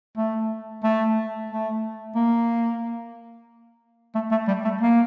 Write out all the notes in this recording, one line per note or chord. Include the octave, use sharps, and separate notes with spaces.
A3
A3
A3
A#3
A3
A3
G3
A3
A#3